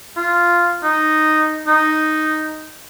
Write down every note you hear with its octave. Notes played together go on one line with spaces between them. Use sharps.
F4
D#4
D#4